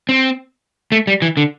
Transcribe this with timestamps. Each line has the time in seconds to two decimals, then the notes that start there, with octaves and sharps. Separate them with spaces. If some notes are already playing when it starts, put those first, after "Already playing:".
0.09 C4
0.92 A3
1.07 G3
1.22 E3
1.37 D3